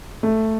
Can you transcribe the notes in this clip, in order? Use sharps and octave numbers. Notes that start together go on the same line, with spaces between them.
A3